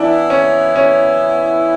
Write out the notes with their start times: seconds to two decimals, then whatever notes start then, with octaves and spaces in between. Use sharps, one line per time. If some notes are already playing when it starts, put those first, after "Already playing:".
Already playing: E3 B3 D4 E4
0.30 C#4
0.76 C#4